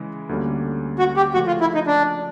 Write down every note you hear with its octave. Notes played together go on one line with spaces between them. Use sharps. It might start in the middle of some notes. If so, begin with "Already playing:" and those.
Already playing: C#3 E3 G#3
D2 D3 G3 A#3 C#4
F#4
G4
C#3 F3 A3 C#4 F#4
F4
E4
D#4
D4